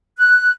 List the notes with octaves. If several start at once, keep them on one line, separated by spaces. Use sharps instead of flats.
F#6